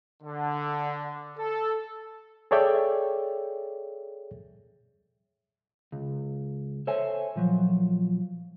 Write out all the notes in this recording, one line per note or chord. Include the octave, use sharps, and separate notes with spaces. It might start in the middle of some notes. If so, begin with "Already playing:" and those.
D3
A4
G#4 A4 C#5 D5 E5 G5
C#2
A4 C5 C#5 E5 G#5
A#2 F3 F#3